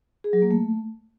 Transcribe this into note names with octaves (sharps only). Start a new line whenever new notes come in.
G#4
F#3
A#3
A3